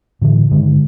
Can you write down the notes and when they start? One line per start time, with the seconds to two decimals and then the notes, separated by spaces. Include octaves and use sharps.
0.21 A2 D3 E3
0.51 G2 D3 D#3 G#3